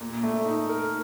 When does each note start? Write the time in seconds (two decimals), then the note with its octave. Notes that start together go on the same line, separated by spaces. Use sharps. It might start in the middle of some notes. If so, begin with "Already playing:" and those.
0.01 A#2
0.23 A3
0.46 D#4
0.69 A#4